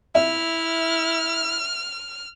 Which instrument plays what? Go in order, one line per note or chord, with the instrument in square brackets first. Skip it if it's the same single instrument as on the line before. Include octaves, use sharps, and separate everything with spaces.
[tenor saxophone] E4 [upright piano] E5 [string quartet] F6